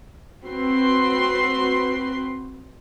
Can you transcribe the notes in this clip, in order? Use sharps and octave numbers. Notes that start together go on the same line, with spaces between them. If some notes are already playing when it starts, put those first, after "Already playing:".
C4 F#4 B4 C6